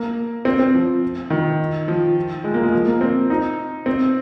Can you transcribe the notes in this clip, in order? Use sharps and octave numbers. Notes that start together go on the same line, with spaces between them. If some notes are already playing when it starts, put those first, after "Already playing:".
Already playing: A#3
C4
C4
F3
D#3
F3
G#3
A#3
G#3
F3
A#3
C4
D#4
C4